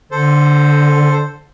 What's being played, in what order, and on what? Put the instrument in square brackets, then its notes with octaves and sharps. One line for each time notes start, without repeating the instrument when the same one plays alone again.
[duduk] D3 [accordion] A4 C5